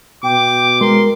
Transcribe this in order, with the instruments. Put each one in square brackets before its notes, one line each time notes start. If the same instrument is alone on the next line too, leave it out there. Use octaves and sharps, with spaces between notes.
[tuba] B2 [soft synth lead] G5 [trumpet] D6
[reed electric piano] G#3 [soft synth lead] A#4 [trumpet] C6